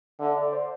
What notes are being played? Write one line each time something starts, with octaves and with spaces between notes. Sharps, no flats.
D3 E5
D5
C5